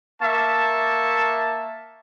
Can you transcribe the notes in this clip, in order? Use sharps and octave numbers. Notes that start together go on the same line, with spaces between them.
A#3 E5 A5 C#6